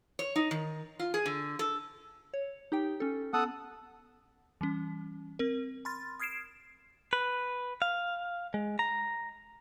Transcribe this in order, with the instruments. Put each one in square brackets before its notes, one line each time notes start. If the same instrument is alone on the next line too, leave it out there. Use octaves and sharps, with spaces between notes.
[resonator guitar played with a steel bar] C#5
D#4
D#3
F4
G#4
D3
A4
[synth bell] C#5
D#4 G4 G5
C#4 A4
[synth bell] B3 [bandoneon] A4 F#5 D#6
[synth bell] E3 G3 C#4
C4 A#4
B5 C6 F6 A6
D#6 F6 G#6 C7 D7 E7
[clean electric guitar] B4
F5
G#3
A#5